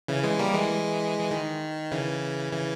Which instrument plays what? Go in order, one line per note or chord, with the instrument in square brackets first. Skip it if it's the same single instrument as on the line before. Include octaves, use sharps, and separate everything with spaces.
[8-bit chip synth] C#3 E3
E3 G#3
G3 A#3
E3 G#3
E3
D#3
C#3 E3
C#3 E3